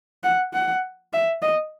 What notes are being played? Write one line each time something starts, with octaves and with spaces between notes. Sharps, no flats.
F#5
F#5
E5
D#5